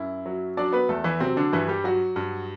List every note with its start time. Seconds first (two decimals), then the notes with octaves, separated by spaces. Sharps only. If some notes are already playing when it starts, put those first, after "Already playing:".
Already playing: F#2 E4
0.26 F#3
0.57 F#3 D4 D5
0.73 B3 B4
0.89 E2 A3 A4
1.04 E3 E4
1.20 C3 F#3 C4
1.37 D3 D4
1.53 G2 E3 E4
1.68 G3 G4
1.84 F#3 F#4
2.16 G2